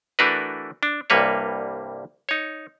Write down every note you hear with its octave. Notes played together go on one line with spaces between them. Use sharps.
E3 A3 D4 F#4 A#4 B4
D4
C2 G2 G3 A#3 B4 C#5
D#4 C#5